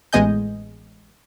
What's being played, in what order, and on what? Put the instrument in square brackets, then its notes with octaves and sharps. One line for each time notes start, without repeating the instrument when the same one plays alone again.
[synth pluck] A1 G#3 B3 D#5 G#5 G6